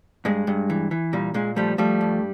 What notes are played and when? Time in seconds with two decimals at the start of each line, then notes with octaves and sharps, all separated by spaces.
0.25 G2 G#3
0.47 G2
0.70 E3
0.91 E3
1.13 A#2 G3
1.34 A#2 G#3
1.56 F3 G3 A3
1.78 F3 G3 A3
2.01 G2